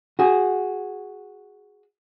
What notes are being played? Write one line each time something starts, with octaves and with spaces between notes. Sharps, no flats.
F#4 G#4